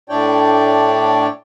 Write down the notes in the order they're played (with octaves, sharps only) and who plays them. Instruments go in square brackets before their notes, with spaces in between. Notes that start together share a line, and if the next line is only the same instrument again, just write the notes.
[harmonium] A2 D4 E4 C#5 D5 G5